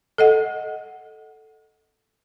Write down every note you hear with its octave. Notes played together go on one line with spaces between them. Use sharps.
A4 D#5 F#5